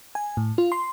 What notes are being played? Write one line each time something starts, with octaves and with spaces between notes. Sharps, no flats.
G#5
A2
F4
C6